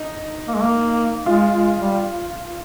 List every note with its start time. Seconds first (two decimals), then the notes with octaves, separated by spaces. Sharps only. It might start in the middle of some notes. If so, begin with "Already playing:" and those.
Already playing: D#4
0.48 A#3
0.55 G#3
0.63 A#3
1.26 G#3 F4
1.53 G#3
1.79 G3